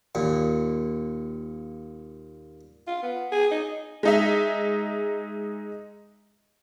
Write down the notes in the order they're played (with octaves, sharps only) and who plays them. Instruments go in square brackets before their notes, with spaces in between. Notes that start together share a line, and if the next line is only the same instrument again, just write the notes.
[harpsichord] D#2 A#2
[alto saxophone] F4
B3
G#4
D#4
[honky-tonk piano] G#3 D#4 E5